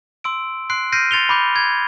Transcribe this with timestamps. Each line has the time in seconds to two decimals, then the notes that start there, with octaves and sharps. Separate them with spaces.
0.24 C6 E6 D7
0.70 C6 F#6 C7 D7
0.92 F6 G6 A#6 C7 D7 D#7
1.11 C6 A6 C#7 F7 G7
1.29 B5 D6 G6
1.56 G#6 A6